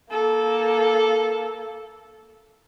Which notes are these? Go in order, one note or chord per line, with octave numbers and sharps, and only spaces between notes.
A#3 A4